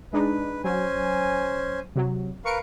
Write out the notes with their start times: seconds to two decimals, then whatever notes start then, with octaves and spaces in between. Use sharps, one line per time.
0.13 G#3 D4 D#4 B4
0.64 F#3 C#4 C5 G#5
1.96 C3 F#3
2.45 A#4 B4 F5 C#6 C#7 D7